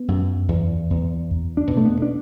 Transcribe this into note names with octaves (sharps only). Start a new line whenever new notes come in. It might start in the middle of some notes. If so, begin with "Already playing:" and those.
Already playing: B3
F#2
E2
E2
E2
D4
B2
A3
B3
D4